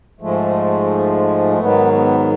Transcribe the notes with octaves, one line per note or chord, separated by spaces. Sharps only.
G#2 F3 G#3 A3
G#2 D#3 F#3 B3
B3